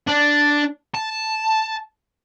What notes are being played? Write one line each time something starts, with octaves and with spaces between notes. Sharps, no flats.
D4
A5